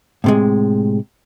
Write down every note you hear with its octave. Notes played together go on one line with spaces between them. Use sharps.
A2 C3 G#3